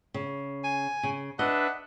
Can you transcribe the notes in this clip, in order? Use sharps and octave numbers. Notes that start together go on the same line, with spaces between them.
C#3
G#5
C#3
D4 B4 D#5 E5 F#5